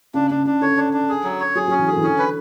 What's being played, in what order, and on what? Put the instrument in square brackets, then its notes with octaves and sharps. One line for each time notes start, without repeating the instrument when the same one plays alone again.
[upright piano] C#3 [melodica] D4
[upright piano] C#3 [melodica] D4
[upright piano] C#3 [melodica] D4
[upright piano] D3 [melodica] C#5
[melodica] D4
D4
G#4
F#3
C#5
[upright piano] F#3 [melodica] G#4
[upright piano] F#3 [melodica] C#4
[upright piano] E3
[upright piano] D3 [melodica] G#4
[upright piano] E3
[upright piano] D3 [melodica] C#4
[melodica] B4